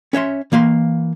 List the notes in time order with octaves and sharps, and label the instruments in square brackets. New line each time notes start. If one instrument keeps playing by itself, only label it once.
[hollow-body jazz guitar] C#4 C#5 E5 C6
E3 A#3 F5 C6